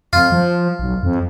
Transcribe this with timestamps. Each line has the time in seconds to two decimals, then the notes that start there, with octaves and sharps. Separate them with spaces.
0.13 F2 F4
0.32 F3
0.79 B1
1.03 F2